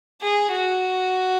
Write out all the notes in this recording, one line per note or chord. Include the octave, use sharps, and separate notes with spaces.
G#4
F#4